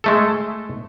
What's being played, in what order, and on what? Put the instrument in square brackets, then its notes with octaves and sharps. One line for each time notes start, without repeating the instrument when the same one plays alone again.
[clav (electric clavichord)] G#3 A3 A4